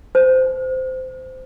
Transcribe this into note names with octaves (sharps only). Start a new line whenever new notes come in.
C5